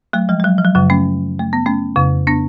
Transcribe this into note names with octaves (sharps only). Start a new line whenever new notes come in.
F#3 A3
F3 G#3
G#3
F#3
F3
F#3
F#2 C#3 F#3
A3 C#4
A3
B3
A3 C#4
F2 C#3
B3 D4